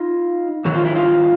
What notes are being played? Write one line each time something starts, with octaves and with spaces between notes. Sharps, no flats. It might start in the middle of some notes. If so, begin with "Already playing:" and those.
Already playing: D#4 F4
G#2 D#3 F#3 F#4
F4
E4
D#4 F4